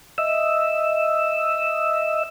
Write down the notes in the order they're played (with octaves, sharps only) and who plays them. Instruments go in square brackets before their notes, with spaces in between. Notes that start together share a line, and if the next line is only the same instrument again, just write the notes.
[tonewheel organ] D#5 E5 E6